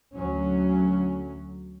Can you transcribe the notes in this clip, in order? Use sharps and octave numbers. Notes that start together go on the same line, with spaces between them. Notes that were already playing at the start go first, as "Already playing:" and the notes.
D2 F#3 C#4